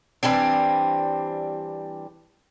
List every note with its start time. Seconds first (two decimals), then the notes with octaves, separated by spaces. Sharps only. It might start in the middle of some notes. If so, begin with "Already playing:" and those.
0.23 E3 G3 C4 D4